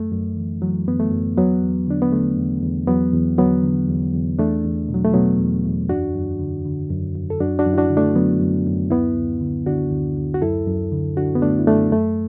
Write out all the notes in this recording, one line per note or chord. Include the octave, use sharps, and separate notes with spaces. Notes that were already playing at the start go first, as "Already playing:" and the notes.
Already playing: F#2 A3
F#2
E3
E3 F#3
F#2 B3
A3
F#2
E2 F#3 B3
E2
D3 D4
B3
D3 A3
E2
E2
E2 F#3 B3
E2
D3 F#3 B3
D3
E2
E2
E2 A3 D4
E2
B2
F#3
A3
B2 F#3 B3
E2
E2
F#2 D4 F#4
F#2
D3
D3
F#2
F#2
A4
F#2 D4 F#4
D4 F#4
F#2
E4
D4 F#4
D3
A3 D4
D3 F#3 B3
F#2
F#2
D2 B3 E4
D2
D3
D3 D4 F#4
D2
D2
F#4
F#2 E4 A4
F#2
D3
D3 D4 F#4
B3
F#2 A3 D4
E4
F#2 A3 D4
F#2 A3